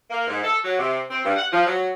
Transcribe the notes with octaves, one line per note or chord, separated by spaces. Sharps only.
A#3
G#2
A4
F#3
C3
C4
G2
F#5
F3
F#3